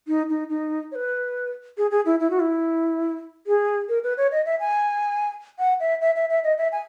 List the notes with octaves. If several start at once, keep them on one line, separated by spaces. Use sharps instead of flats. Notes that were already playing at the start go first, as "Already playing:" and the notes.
D#4
D#4
D#4
C#5
B4
G#4
G#4
E4
E4
F#4
E4
G#4
A#4
B4
C#5
D#5
E5
G#5
F#5
E5
E5
E5
E5
D#5
E5
G#5